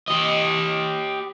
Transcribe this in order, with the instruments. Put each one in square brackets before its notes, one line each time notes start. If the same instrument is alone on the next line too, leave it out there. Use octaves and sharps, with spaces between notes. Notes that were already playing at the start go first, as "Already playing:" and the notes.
[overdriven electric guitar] G4 D#5